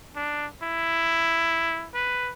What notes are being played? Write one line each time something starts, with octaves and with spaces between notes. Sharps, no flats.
D4
E4
B4